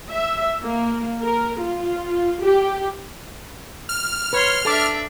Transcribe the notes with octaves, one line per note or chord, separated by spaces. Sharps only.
E5
A#3
A#4
F4
G4
F6
B4 C#5 C6
D4 A4 E5 A5 D6